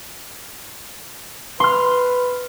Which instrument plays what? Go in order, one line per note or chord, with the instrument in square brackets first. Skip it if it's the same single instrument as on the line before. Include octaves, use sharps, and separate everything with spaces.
[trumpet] B4 [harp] C6 F6